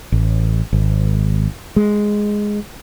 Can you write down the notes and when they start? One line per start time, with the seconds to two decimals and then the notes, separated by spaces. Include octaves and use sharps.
0.12 A1
0.73 G#1
1.76 G#3